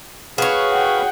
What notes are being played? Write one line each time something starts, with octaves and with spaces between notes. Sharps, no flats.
F#4 G#4 B4 C#5 F5 B5
F#5 G5